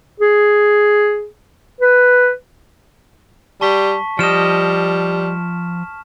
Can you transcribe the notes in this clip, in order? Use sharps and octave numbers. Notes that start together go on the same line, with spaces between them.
G#4
B4
G3 A5 C#6 B6
F3 G3 D#5 F6 E7